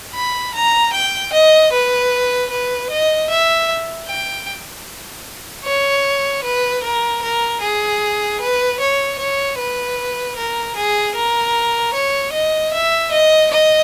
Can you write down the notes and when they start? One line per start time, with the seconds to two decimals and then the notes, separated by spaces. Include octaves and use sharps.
0.15 B5
0.54 A#5
0.93 G5
1.32 D#5
1.72 B4
2.50 B4
2.90 D#5
3.29 E5
4.08 G5
5.65 C#5
6.43 B4
6.83 A#4
7.22 A#4
7.61 G#4
8.40 B4
8.80 C#5
9.19 C#5
9.58 B4
10.37 A#4
10.76 G#4
11.16 A#4
11.94 C#5
12.33 D#5
12.73 E5
13.12 D#5
13.51 D#5